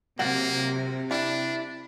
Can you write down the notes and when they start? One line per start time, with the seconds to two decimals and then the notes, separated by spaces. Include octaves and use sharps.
0.19 C3 F#3 A#3 F4 F#5
1.11 G3 D4 E4